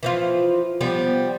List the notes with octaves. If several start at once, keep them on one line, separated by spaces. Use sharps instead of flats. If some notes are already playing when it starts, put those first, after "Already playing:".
E3 F3 F4
F3 G3 B3